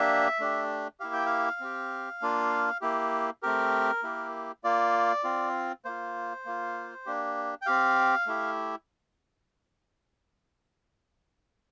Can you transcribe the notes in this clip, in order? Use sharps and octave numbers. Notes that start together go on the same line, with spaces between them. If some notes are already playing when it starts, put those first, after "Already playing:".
Already playing: A#3 D4 G4 E5
A3 D4 G4
A#3 E4 G4 F5
G5
F5
C4 G4
A#3 D4 F4
A#3 E4 G4
A3 C4 G4 A#4
A#3 E4 G4
A#3 F4 D5
C4 F4
A#3 F4 C5
A#3 F4
A#3 D4 G4
G5
C4 G4 F5
A3 E4 G4